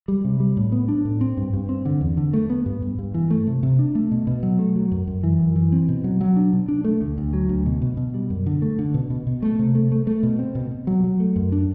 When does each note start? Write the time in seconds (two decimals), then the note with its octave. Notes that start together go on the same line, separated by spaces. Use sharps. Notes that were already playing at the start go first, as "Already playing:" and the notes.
0.08 G3
0.25 C3
0.40 G3
0.57 A2
0.72 B3
0.88 D4
1.05 A2
1.21 C4
1.37 G2
1.53 G2
1.69 C4
1.85 D3
2.01 E2
2.17 D3
2.33 A3
2.50 B3
2.66 G2
2.82 G2
2.99 G2
3.14 E3
3.30 A3
3.47 C3
3.63 C3
3.79 D4
3.95 A3
4.11 B2
4.27 B2
4.43 F#3
4.59 A3
4.76 F#3
4.92 F#2
5.07 F#2
5.23 E3
5.39 F#2
5.56 E3
5.72 C4
5.88 B2
6.04 F#3
6.21 F#3
6.37 D4
6.53 B2
6.68 D4
6.84 A3
7.01 D2
7.18 D2
7.33 F#3
7.49 D2
7.66 B2
7.82 B2
7.97 B2
8.14 G3
8.30 F#2
8.46 D3
8.62 A3
8.79 D3
8.94 B2
9.10 B2
9.27 B2
9.42 A3
9.59 C3
9.75 A3
9.92 A3
10.07 A3
10.23 B2
10.39 C4
10.55 B2
10.71 B2
10.87 F#3
11.04 F#3
11.20 A3
11.36 F#2
11.52 D4